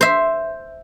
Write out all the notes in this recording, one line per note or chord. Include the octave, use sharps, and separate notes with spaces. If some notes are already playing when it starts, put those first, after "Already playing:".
C5 E5